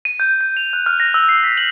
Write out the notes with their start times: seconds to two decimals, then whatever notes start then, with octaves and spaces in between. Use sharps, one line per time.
0.05 D#7
0.20 G6
0.41 G6
0.57 F7
0.73 F#6
0.86 F6
1.00 A#6
1.14 E6
1.29 C7
1.44 B6
1.57 F#7